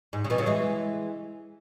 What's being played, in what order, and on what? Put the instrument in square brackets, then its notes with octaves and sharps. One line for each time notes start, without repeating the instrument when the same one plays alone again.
[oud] G#2
C#3
B2 E3
C#3 F#3
E3 G#3